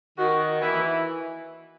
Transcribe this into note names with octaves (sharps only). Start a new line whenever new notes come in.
D#3 F#4
E3 E4